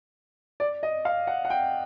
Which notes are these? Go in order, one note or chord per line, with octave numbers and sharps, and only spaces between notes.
D5
D#5
F5
F#5
F#5
G5